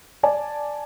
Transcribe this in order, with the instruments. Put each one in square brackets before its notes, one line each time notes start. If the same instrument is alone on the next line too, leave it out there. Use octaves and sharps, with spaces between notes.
[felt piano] D5 G#5 A5